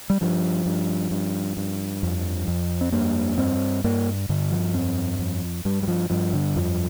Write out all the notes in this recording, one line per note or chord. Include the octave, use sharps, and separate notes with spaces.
G3
G2 F3
G2
G2
G2
F2 F3
F2
C4
G2 A#3
G2 C4
G2 A#3
G2 D3
F3
F2 C4
F2
G2 G3
G3
F3
G2 F3
D3
F2 F3